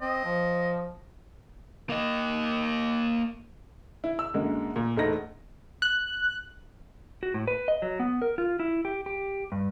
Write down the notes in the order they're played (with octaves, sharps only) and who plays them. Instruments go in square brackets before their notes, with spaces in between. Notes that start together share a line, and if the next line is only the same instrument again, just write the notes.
[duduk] C4 [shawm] D#5
[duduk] F3
[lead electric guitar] A#3 D#5
[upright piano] E4
E6
F#2 D3 G#3 A#3
A#2
E1 A3 D#4 A#6
[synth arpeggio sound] F#6
[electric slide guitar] F#4
A2
B4
D#5
F#3
B3
A#4
F4
E4
G4
G4
G2